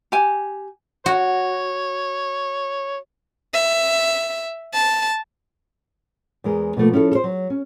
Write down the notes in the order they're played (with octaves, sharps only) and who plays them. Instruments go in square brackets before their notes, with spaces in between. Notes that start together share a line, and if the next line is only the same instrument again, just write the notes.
[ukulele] G4 G#5
[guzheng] F#4 [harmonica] C#5
[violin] E5
A5
[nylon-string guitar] E2 G#3 A#4
B2 F3 A3 A#3
F3 C#4 E4 G4 A4
A4 C5
F#3
C#4